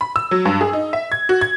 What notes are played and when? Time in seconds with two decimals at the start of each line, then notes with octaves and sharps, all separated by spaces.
0.01 B5
0.16 E6
0.31 F#3
0.45 G2
0.61 G#4
0.73 D#4
0.93 E5
1.12 G#6
1.29 F#4
1.41 G#6